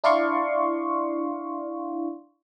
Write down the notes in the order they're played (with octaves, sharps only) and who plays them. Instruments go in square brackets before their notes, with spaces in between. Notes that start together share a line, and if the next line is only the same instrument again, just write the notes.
[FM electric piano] D4 E4 D5 F5 C6 C#6